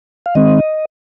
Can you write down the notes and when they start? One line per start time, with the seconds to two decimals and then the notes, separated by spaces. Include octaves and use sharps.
0.26 F5
0.35 D#3 G#3 C4 D#5